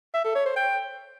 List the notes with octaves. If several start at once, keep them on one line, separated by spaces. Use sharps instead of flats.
E5
A4
C#5
C5
G5